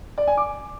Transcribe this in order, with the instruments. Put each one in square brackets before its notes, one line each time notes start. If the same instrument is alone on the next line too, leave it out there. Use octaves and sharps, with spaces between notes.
[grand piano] D5
G#5
D6